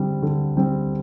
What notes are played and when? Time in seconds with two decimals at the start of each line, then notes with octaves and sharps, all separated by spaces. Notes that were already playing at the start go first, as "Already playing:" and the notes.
Already playing: D3 G3 C4
0.23 D3
0.57 G3 C4